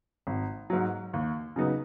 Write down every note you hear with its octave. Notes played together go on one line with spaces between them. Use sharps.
G#1
G#2 F#3
D#2
C#3 F#3 B3 D#4